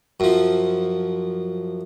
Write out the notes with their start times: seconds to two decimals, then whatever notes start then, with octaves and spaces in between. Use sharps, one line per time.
0.20 F#2 F3